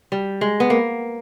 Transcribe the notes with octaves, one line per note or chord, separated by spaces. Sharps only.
G3
G#3
B3
A#3